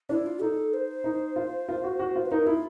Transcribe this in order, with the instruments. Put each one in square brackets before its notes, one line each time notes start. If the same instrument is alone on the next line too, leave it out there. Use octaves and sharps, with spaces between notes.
[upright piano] D4 [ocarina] E4
[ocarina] F4
[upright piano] D#4 [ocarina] A4
[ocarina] C5
[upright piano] D#4
F4
F4
F#4
F#4
F4
[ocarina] B4
[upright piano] D#4 [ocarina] A#4
[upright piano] E4 [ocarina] F4